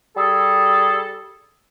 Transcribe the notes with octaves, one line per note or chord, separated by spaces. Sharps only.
G3 G#4 A4